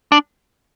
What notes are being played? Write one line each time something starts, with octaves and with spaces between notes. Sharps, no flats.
D4